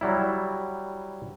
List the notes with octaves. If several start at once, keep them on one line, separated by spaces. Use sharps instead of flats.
F#3 G3 E4